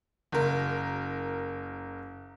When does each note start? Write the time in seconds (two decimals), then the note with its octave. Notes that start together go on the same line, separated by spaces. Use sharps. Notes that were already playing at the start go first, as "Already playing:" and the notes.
0.32 F#1 A#4